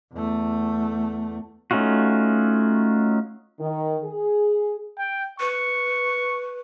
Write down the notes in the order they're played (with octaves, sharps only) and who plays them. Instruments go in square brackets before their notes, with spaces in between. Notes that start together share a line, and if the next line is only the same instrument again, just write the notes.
[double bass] E2 A3
[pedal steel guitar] A3 C#4 D#4 F4 F#4
[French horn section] D#3
G#4
[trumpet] G5
[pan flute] B4 [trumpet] C#6